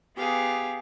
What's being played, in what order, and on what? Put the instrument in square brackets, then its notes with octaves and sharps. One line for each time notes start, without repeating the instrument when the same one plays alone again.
[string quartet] B3 G4 G#4 F5